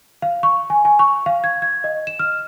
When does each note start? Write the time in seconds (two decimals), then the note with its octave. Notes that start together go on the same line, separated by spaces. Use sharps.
0.22 F5
0.43 C#6
0.70 G#5
0.85 G#5
0.99 C#6
1.26 F5
1.44 G#6
1.62 G#6
1.84 D#5
2.07 E7
2.19 F6